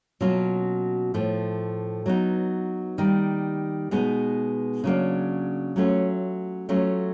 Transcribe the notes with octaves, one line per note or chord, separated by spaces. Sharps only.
B2 F#3 A#3 C#4 F4
A2 F3 A3
F#3 B3 D#4
D#3 G3 A#3
B2 G#3 B3 D#4
C#3 F#3 A#3 D4
F#3 A3 C#4 F4
F#3 A3 C#4 F4